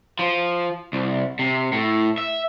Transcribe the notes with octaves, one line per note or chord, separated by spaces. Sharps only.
F3
C2
C3
A2
E5